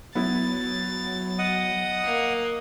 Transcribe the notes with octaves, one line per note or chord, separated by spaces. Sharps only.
F#3 B3 E4 A6
D#5 F#5 D#6
A#3